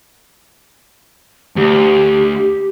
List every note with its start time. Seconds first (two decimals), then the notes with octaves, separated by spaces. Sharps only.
1.57 D2 G4